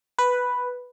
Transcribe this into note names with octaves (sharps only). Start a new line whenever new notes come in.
B4